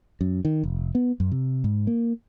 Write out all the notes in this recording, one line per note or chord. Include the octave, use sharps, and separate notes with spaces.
F#2
D#3
F1
B3
F#2
C3
G#2
A#3